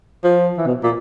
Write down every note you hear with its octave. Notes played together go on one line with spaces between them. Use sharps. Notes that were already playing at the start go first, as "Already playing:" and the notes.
F3
E3
B2
A#2